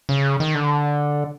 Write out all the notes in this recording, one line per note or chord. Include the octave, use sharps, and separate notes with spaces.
C#3
D#3
D3